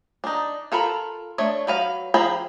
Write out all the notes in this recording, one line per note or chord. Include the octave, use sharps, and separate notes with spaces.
D4 D#4
F4 A4 A#4 B5
A3 D4 C#5
F#3 B4 F5
F3 G#4 G5 A#5 B5